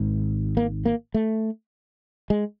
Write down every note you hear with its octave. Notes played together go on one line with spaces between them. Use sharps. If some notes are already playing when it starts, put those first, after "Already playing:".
Already playing: G#1 G#2
A#3
A#3
A3
G#3